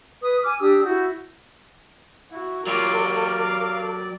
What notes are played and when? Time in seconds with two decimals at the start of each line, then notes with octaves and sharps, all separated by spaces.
0.23 B4 D#6
0.44 G#5 D6 F6
0.60 D4 G4 D#6 E6
0.85 E4 F#4 G6
2.31 E4 F#4
2.67 F#3 F4 G4 A#4 D5
3.06 F5